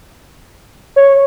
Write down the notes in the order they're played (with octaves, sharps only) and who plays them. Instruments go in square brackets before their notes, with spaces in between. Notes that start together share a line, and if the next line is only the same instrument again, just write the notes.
[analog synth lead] C#5